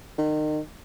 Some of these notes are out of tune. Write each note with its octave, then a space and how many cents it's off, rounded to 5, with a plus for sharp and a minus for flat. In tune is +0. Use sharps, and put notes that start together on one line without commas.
D#3 -30